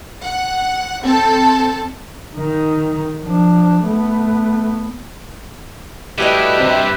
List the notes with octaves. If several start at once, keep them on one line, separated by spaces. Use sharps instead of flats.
F#5
C4 A4 A5
D#3 D#4
F3 D4
A3 B3
A2 G3 F#4 G4 B4 D#5 E5
D2 G2 C3 C4